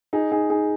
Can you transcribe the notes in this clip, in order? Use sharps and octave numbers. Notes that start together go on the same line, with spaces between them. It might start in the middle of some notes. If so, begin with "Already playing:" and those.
D#4 G#4
D#4 G#4
D#4 G#4